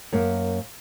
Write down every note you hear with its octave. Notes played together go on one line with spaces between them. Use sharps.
F#2 A#3